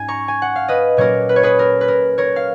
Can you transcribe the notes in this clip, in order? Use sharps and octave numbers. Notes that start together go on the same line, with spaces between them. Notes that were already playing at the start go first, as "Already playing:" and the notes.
Already playing: G#2 F#3 C#4 G#5
A#5 C#6
G#5
F#5
F5
B4 D#5
A#2 F#3 A#3 C#4 A#4 C#5
B4
C#5
G#4 B4
A#4
B4
A#4
A#4 C#5
F5